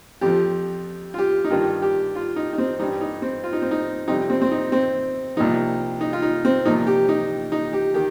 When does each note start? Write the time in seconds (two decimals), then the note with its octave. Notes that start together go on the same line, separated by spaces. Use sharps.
0.21 F2 F3 G4
1.14 F4
1.18 G4
1.44 D#4
1.50 G2 D#3 G3 F4
1.82 G4
2.15 F4
2.36 D#4
2.53 D#4
2.58 C4
2.79 G3 D#4
2.82 G2
3.01 D#4
3.22 C4
3.44 F4
3.53 D#4
3.62 C4
3.71 D#4
4.07 F2 C3 G3 D#4
4.30 C4
4.41 C4
4.51 D#4
4.72 C4
5.37 C2 A#2 F3 D#4
6.01 D#4
6.13 F4
6.22 D#4
6.45 C4
6.65 C2 A#2 F3 D#4
6.87 G4
7.09 D#4
7.52 D#4
7.73 G4
7.94 D#3 G4